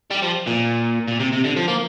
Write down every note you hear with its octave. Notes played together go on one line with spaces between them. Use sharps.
G3
F3
A#2
A#2
C3
C3
D3
F3
A#3